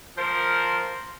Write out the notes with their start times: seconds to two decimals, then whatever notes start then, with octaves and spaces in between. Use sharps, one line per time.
0.17 F3 A#4 C5